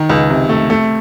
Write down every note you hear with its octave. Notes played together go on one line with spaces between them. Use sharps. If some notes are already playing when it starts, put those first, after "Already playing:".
Already playing: D#3
C#2
C3
A3
A3